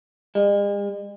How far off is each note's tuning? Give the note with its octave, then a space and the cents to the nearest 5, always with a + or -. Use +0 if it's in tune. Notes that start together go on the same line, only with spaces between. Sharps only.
G#3 -45